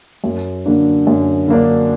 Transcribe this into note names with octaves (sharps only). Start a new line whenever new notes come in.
F#2
D3 A#3 D4
F#2
D3 A#3 D4